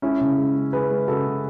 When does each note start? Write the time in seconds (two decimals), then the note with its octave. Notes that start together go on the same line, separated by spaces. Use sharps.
0.02 G#3 C#4 E4
0.21 C#3
0.38 G#3
0.55 G#3
0.73 G#3 G#4 B4
0.91 G#3
1.08 C#3 F#4 A4
1.26 C#3